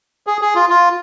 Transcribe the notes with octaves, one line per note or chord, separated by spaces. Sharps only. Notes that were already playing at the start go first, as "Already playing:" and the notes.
G#4
G#4
F4
F4